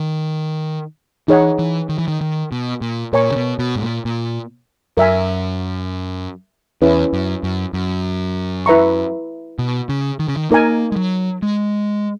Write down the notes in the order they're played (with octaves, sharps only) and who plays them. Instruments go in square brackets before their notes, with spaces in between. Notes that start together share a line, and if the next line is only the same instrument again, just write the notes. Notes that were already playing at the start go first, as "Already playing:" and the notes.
Already playing: [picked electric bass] D#3
[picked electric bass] E3 [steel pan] D#4 G#4 C#5 F#5
[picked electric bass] E3
D#3
E3
D#3
D#3
B2
A#2
[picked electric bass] A#2 [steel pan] A#4 C#5 G#5 C#6
[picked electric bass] C#3
B2
B2
G#2
A#2
A#2
[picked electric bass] F#2 [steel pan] A#4 E5 G#5
[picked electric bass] E2 [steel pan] C#4 E4 B4
[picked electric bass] F#2
F#2
F#2
[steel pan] E4 B4 E5 A#5 C#6
[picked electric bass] B2
C#3
D#3
C#3
D#3
[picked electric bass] A#3 [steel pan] D#4 A#4 D#5 G#5
[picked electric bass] G#3
F#3
G#3